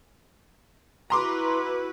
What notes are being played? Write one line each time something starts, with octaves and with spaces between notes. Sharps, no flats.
E4 F#4 B4 A#5 C6 D6